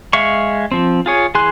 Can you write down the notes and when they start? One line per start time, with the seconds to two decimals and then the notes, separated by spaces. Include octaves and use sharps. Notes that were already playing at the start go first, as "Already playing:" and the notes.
0.13 G#3 E5 F5 C#6
0.72 F3 C4
1.06 F4 G#4 C#5
1.35 E3 G#4 G#5 C6 F#6